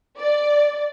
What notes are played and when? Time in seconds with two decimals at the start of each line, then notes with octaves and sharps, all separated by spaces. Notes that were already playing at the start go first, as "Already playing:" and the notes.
0.19 D5